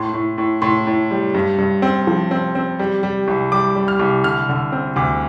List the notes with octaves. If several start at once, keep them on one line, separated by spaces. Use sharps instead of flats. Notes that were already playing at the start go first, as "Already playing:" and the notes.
Already playing: A2 C6
A2
A2
A2 C6
A2
G3
G2
G2
C4
F3
C4
C4
G3
G3
C2
G3 D6
G3
F6
C2
D3 F6
D3
C4
D2 D6